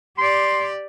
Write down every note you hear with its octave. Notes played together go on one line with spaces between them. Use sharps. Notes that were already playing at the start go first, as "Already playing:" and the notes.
G4 D5 C6